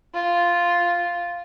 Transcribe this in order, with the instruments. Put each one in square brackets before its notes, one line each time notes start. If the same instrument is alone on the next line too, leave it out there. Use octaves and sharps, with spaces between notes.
[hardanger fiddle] F4